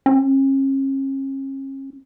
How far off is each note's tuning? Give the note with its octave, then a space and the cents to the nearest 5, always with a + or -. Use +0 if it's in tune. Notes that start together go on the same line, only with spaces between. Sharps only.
C#4 -40